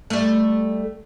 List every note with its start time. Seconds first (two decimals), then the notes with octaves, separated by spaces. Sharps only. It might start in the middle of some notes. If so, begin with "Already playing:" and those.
0.10 G3 A3